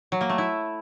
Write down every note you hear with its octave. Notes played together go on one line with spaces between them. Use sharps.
F#3
A#3
A3
E4